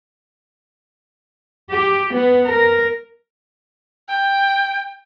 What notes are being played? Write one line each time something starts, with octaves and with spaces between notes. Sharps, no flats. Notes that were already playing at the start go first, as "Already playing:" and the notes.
G4
B3
A#4
G5